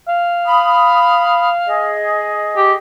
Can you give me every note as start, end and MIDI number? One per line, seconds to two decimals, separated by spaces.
0.08 2.01 77
0.45 1.48 83
0.45 1.48 87
1.66 2.75 68
1.66 2.75 75
2.57 2.73 67